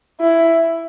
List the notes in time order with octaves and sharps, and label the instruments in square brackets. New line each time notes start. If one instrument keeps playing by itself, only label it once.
[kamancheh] E4